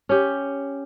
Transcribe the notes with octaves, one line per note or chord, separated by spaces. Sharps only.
C#4 G4